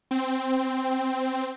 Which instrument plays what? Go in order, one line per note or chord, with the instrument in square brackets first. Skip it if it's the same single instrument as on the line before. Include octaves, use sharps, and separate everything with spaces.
[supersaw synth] C4